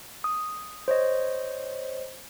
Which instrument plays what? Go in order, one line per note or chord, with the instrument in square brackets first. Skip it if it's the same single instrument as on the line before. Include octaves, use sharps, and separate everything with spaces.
[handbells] D#6
C5 C#5 D#5